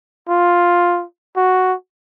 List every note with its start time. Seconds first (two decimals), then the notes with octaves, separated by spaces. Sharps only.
0.28 F4
1.36 F#4